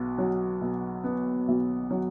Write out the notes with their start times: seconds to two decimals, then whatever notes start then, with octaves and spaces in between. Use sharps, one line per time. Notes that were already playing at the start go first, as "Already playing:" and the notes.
Already playing: B1 B3
0.18 F#3
0.61 B2
1.04 B3
1.48 B1
1.91 F#3